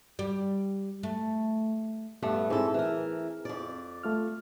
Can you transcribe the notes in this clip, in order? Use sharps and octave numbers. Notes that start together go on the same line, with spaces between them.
G3
A3
G2 A3 B3
G#2 C4 E4 G#4 A4
E3 A#4
F2 D5
A3 F4 F6